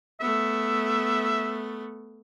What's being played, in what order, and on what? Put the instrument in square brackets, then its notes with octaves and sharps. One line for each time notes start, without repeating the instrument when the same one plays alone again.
[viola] A3 B3 [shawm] E5